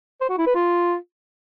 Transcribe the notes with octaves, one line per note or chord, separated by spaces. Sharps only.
C5
F#4
E4
B4
F4